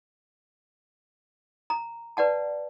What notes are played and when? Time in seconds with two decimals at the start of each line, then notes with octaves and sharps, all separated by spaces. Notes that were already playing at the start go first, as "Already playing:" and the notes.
1.70 A#5
2.17 B4 D5 F#5 A5